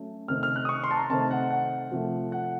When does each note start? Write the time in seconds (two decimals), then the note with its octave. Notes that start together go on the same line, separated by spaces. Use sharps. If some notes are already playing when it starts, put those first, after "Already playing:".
Already playing: F#3 A3 C#4
0.28 C3 D#3 A3 C4 F6
0.43 F6
0.56 F#6
0.65 D#6
0.69 C#6
0.84 C6
0.91 A5
0.97 A#5
1.09 C3 D#3 A3 C4 A5
1.31 F#5
1.51 F#5
1.91 C3 F3 A3
2.32 F#5